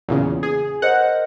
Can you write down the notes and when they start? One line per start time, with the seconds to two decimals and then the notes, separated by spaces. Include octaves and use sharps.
0.09 E2 A#2 C#3
0.43 G#4
0.82 A#4 C5 D#5 F#5